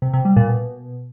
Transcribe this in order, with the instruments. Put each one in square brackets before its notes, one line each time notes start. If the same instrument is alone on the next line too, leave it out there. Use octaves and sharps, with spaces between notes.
[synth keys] C3
C3
G3
A#2
B2